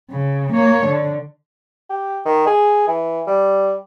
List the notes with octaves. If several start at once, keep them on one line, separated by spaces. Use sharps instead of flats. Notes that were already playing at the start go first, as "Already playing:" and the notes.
C#3
A#3 C#5
D3
G4
D#3
G#4
E3
G3